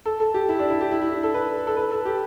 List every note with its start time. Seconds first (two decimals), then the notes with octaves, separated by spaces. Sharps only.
0.06 A4
0.20 A4
0.34 G4
0.49 E4
0.59 D4
0.70 E4
0.81 G4
0.91 E4
1.02 E4
1.13 D4
1.23 A4
1.34 B4
1.67 A4
1.77 B4
1.91 A4
2.05 G4